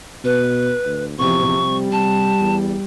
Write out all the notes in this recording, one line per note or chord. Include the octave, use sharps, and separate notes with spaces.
B2 B4
D2
E2 C3 F3 C#6
C3 G3
C3 A5
E2